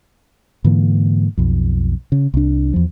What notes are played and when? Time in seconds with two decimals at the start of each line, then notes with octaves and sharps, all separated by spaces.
0.64 G#2 D3 E3 A#3
1.37 B1 F2
2.12 C#3
2.34 C2 D4
2.74 E2 F3